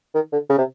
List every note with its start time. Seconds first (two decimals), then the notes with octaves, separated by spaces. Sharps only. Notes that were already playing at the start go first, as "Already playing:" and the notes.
0.15 D#3
0.32 D3
0.49 C#3
0.58 C3